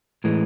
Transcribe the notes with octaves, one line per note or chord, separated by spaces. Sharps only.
A2 E3 G#3